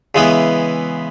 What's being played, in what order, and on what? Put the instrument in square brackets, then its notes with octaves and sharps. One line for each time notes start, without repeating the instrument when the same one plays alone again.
[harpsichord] C#3 E3 G#3 B3 E4